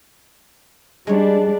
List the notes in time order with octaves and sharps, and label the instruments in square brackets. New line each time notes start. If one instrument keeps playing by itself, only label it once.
[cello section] G3 D4 [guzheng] G#3 C#5